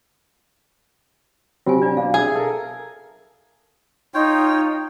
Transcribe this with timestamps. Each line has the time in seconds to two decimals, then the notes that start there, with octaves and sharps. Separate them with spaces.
1.66 C3 F#3 C4 F4 G4 G#5
1.82 D4 F4 D5
1.97 B2 F#3 D4 F5
2.14 G#4 E5
2.36 A4 A#4
4.14 D#4 F4 C#5 G5